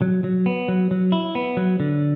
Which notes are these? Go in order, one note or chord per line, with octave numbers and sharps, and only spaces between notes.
F#3
F#3
B3
F#3
F#3
E4
B3
F#3
D3